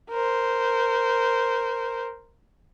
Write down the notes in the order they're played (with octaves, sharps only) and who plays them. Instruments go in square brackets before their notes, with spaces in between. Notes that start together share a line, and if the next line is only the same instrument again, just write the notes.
[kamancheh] A#4 C5